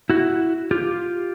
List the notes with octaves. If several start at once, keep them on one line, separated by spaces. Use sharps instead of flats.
E4 F#4
F4 G4